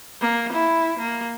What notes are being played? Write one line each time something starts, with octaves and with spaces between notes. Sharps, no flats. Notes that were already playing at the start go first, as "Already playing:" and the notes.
A#3
E4
A#3